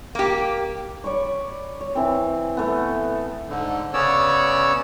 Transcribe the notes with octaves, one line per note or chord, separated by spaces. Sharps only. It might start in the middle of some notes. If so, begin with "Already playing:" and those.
A#3 G4
C#5 D5 B5 C#6
C#5
E3 C4
A3 B3
G#2 D3
C#3 B3 C#4 C#5 D5 E6